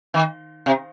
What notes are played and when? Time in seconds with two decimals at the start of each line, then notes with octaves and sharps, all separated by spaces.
0.14 D#3
0.66 C3